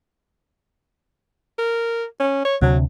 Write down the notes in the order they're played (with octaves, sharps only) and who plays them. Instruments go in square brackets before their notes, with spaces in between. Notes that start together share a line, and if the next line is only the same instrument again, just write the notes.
[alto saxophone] A#4
C#4
C#5
[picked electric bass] D2 C3 D4 [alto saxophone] F#3